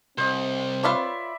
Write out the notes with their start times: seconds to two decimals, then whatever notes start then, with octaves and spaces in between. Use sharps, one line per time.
0.18 C2 C4 C5 D#5
0.83 F4 B4 C#5 D5 E5 B5